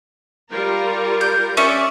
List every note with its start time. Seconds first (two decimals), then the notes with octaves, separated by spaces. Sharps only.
0.52 G3 F4 A#4
1.21 G6
1.57 C#4 D5 E5 C#6